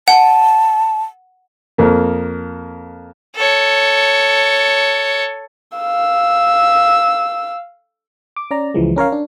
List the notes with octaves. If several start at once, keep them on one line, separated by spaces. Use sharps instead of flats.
F#5 A5
F2 A#3
A4 C#5
F5 E6
D6
C#4 D5 A#5
C#2 E3 F3 G#3
C#4 A#4 C#5 F5
D4